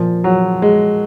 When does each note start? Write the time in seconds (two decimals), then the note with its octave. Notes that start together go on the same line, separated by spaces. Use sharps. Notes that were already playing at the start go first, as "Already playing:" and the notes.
Already playing: A#2 F3
0.24 F#3
0.62 G#3